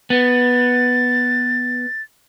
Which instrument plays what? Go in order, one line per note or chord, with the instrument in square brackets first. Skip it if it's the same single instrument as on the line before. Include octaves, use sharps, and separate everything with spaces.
[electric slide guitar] B3 [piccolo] A6